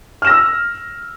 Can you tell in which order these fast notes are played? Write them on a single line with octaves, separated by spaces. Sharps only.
F6 E7 A#6 E6